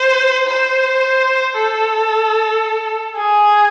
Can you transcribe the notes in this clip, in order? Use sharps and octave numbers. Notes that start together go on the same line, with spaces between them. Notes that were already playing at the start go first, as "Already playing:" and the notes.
Already playing: C5
C5
A4
G#4